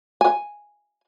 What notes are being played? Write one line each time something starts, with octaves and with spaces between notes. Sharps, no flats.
G#5